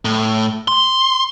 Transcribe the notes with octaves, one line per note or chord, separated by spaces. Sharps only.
A2
C6